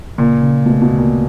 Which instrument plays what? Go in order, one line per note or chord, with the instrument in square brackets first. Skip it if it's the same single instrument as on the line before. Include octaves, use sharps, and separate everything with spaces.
[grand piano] A#2 [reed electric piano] C#3
[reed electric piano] C#3
[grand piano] B2 [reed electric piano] A3
[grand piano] B2
[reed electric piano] D2
[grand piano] A#2